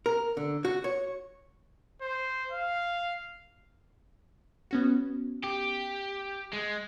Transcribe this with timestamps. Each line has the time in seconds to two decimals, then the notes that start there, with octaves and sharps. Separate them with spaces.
0.06 A#4
0.37 D3
0.65 F#4
0.84 C#5
2.02 C5
2.51 F5
4.71 B3 C#4 F#4
5.44 G4
6.53 G#3